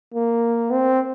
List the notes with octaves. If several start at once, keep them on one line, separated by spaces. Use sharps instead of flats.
A#3
C4